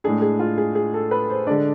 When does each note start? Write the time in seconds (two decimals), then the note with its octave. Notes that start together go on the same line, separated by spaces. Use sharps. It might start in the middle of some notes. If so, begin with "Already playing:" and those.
0.04 A2 G#3 D4 G#4
0.22 G#4
0.39 F4
0.58 G#4
0.75 G#4
0.94 A4
1.11 B4
1.30 C5
1.47 D3 G#3 D4 D5